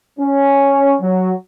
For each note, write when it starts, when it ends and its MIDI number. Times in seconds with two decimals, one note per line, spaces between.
0.19 0.96 61
1.01 1.31 54